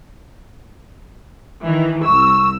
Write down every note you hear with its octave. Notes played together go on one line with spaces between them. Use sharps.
D#3 E3
C2 C#6 E6